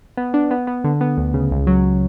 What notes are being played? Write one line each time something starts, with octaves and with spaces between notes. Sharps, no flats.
B3
D4
B3
B3
D3
B3
D2
C#3
C#2
F#3